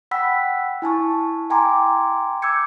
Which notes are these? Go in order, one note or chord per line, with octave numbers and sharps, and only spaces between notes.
F#5 G5 B5 E6 B6
E4 G#5 A5 C#6
G5 G#5 A#5 C6 D6
D6 E6 G6 G#6 C#7